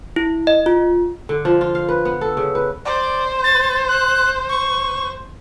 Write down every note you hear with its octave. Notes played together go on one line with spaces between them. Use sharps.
E4
D#5
F4
D3
F3
F4
F5
B4
B3
A4
C#3
B4
C5 D5
A6
F#6
C#6